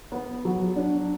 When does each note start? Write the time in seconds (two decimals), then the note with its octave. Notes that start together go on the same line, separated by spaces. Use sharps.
0.12 B3
0.45 F#3
0.76 D4